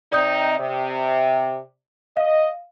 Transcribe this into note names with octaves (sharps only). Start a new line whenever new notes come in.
C3 C4 D#4 D5 D#6 G6
C3
D#5 F5